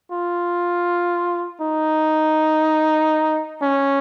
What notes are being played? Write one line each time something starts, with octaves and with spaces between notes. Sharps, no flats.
F4
D#4
C#4